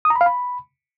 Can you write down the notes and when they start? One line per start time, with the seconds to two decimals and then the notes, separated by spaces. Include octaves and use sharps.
0.05 D#6
0.10 A#5
0.16 B5
0.21 F5
0.26 B5